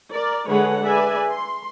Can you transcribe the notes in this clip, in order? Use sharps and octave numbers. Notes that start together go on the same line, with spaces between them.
A#4 D5
D3 G#3 G#4 B4 C#5 F#5
G#4 B4 D5 E5 G#5
C6